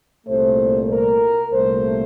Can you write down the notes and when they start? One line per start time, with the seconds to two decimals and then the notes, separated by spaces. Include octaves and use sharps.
0.27 C2 A#2 A3 C5
0.90 A#4
1.52 C2 A#2 A3 C5